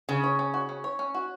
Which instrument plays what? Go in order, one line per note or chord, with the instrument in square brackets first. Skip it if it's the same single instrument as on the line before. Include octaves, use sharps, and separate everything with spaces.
[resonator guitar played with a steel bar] C#3 [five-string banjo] C#4
[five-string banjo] C#5
C#4
F#4
C#4
C#5
C#4
F#4